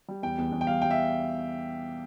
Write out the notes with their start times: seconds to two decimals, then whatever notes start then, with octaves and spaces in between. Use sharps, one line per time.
0.08 G3
0.23 E2 G5
0.38 E2
0.52 E2
0.61 G5
0.67 G3 F5
0.82 G3 G5
0.91 E5